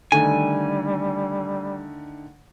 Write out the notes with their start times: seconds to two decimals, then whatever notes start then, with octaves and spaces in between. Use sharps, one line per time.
0.12 D3 D#3 G3 A3 G#5